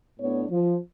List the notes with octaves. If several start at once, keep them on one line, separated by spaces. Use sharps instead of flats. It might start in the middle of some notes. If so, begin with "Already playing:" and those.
A2 B3 D4 C#5
F3